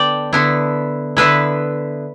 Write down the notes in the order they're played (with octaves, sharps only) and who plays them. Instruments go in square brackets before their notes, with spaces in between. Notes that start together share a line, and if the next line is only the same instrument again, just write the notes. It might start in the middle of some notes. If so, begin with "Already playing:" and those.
Already playing: [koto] D3 B3 D5 G5 A5
D3 B3 E4
D3 B3 E4 B4 E5